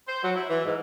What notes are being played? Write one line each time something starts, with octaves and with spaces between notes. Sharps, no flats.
C5
F#3
E4
E3
G#2